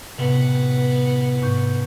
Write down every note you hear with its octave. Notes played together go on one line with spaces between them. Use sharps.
A2 C3 B3
G#2 C#6 G6